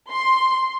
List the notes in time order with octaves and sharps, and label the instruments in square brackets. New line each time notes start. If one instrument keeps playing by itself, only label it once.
[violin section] C6